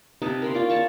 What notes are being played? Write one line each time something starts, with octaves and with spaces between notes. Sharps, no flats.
C3 D#4 B4 A5
A#4 B5 C6
C#4 F4 D5
C#5 D5 A5 C#6